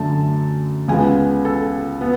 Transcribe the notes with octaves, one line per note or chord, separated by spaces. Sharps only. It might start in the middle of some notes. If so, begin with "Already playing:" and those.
Already playing: F#2 D3 A3 A5
C#2 C#3 G#3 B3 G#5
A4
B3